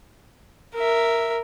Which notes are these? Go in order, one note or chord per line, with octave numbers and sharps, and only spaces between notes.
A#4 E5